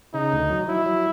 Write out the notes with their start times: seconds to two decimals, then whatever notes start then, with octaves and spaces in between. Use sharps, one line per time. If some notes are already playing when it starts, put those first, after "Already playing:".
0.14 C#3 D#4
0.32 D2
0.50 F#3
0.68 F#3 E4
0.86 F#3